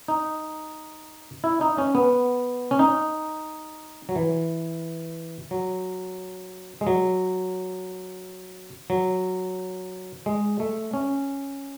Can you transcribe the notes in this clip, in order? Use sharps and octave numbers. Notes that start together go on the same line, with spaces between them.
D#4
E4
D#4
C#4
B3
C#4
D#4
F#3
E3
F#3
G#3
F#3
F#3
G#3
A3
C#4